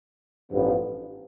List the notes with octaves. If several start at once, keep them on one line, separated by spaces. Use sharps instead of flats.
A1 G2 F3 B3